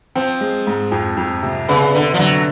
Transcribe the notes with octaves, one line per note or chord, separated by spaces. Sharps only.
F3 C4
G#3
G#2
F2
F2
C3
C#3 B3
D3 B3
F3
D3 F#3